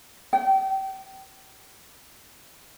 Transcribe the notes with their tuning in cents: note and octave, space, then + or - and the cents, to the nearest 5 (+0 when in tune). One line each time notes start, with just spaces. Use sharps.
G5 -30